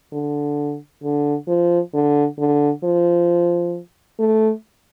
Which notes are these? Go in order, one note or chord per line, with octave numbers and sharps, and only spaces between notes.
D3
D3
F3
D3
D3
F3
A3